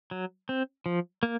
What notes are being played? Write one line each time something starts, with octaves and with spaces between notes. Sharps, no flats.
F#3
C4
F3
A#3